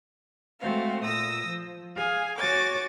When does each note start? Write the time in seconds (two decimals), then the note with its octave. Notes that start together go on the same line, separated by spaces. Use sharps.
0.60 G#3 A3 C4 F#4 F5
1.02 A#2 D#6 E6 A#6
1.46 F3
1.95 G#4 F5 G#5
2.38 F#4 C#5 G#5 D6 A6